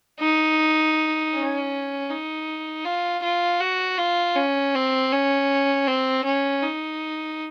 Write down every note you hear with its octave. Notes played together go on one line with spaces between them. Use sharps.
D#4
C#4
D#4
F4
F4
F#4
F4
C#4
C4
C#4
C4
C#4
D#4